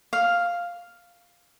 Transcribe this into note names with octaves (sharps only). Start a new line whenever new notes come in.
F5